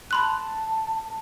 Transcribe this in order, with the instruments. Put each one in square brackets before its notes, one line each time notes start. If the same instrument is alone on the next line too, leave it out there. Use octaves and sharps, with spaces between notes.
[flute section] A5 [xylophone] B5 C6 F#6